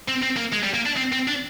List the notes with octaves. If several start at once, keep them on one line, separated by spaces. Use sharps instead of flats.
C4
C4
A#3
G#3
G3
A#3
D4
C4
C4
D4